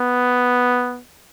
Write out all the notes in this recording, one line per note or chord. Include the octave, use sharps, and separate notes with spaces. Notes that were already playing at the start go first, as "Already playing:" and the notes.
Already playing: B3